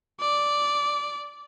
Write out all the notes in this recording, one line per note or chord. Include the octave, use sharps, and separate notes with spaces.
D5